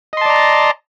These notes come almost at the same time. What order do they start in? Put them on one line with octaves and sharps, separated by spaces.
D#5 C6 A5 D5 A#5